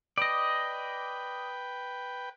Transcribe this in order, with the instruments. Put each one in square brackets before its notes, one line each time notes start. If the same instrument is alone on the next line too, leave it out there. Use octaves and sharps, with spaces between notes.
[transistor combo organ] B4 G5 [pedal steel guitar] D5 D#5